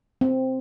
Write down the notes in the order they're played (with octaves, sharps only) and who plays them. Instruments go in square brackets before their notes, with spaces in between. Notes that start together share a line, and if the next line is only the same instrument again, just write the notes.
[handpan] C4